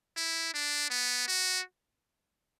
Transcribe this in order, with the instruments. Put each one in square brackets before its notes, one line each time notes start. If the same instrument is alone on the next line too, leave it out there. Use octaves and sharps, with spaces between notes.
[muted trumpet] E4
D4
B3
F#4